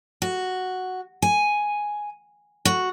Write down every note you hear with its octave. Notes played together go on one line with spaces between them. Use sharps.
F#4
G#5
F#4